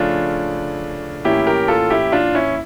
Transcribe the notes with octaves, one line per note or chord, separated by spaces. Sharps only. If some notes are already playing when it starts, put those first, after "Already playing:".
Already playing: C#3 F3 A3 C#4 D4 F4
A2 E3 A#3 C#4 E4 G4
G4 A#4
F4 A4
E4 G4
D4 F4
C#4 E4